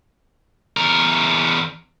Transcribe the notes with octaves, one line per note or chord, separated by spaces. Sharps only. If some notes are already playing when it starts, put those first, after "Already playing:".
E2 A#4